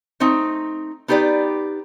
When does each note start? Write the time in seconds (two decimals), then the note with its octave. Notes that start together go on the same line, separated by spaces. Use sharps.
0.20 A3 C4 D#4
1.08 B3 D#4 G4 B4 D5